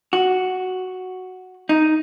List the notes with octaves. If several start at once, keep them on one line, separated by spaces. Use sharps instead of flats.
F#4
D#4